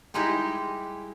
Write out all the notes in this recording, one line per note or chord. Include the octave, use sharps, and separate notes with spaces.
G3 G#3 D#4 E4 G4